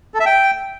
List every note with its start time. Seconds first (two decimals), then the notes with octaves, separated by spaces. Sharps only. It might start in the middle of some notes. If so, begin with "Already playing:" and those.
0.14 A4
0.20 E5
0.26 G5